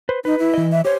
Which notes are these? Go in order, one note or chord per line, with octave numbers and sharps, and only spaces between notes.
B4 C5
D#4 B4
E4
E3 D#5
E5
G4 C5 C#5